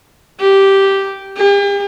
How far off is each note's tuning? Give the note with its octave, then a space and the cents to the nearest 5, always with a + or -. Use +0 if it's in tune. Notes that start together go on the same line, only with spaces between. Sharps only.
G4 -5
G4 +45